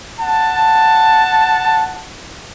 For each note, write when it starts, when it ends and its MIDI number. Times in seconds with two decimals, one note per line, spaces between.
0.20 2.04 78
0.20 2.04 81